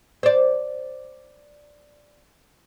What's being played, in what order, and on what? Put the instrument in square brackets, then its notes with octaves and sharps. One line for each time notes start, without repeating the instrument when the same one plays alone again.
[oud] C5 D5